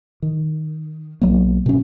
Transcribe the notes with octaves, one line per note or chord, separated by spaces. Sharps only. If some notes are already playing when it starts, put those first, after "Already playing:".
D#3
B1 F#3 A#3
B2 C#4